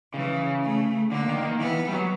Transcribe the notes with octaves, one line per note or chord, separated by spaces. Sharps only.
C#3 E3
A3
D3 A#3
D#3
D#3
E3 B3
G3
F#3